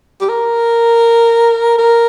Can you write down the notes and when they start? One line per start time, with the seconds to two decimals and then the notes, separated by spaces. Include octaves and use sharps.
0.21 G4
0.29 A#4
1.78 A#4